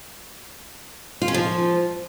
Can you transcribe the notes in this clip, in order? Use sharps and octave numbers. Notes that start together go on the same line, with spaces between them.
F4
C#4
F3